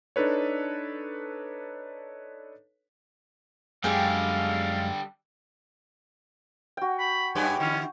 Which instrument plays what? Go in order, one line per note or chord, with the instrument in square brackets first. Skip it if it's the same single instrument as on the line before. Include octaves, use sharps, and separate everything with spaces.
[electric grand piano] D4 D#4 A4 B4 C#5
[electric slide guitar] F#2 G#3 [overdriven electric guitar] D3 G3 [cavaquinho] G4 G#4 G5 [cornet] F5
[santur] F#4 G5
[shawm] B5
[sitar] F#2 G4 B4 [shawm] G#5
[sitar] D3 E4 [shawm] C#4